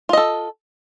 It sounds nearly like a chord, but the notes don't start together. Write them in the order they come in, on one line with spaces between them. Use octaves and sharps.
F4 D#5 A4